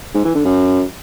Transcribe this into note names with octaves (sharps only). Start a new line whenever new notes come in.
G#2
E3
D3
F#2